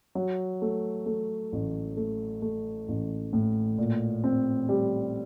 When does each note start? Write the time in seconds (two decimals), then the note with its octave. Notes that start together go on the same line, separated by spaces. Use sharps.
0.15 F#3
0.62 A3
1.06 A3
1.52 A1
1.97 A3
2.42 A3
2.88 A1
3.33 A2
3.78 A#2
4.24 C4
4.69 G3